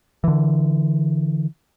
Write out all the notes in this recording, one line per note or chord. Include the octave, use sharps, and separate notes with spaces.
D3 E3